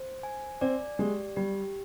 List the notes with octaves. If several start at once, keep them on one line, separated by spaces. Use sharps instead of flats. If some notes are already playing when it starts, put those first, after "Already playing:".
Already playing: C5
G#5
C4 D5
G#3 G4
G3 G4